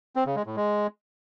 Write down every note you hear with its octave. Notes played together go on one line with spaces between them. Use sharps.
C4
C#3
G#3
A2
G#3